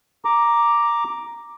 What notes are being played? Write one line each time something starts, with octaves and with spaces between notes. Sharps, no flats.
A#5 D6